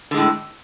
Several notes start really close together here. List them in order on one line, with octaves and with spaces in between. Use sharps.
D3 G#3 A2